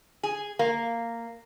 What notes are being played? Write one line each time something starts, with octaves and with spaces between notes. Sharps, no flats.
G#4
A#3